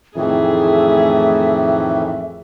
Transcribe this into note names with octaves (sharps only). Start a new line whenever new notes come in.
F2 A2 D#3 E3 A3 G#4 E5